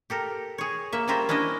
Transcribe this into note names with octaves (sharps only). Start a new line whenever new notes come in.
G4 A4 A#4
G#4 C#5
A#3 E5
G3 C#4 F4 A#4 C5 E5
C#4 D4 E4 F4 D#5